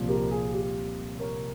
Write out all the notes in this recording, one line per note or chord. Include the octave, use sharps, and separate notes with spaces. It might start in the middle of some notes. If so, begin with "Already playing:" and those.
Already playing: C2 A#2 F3
G4 A#4
G#4
G4
A#4 C#5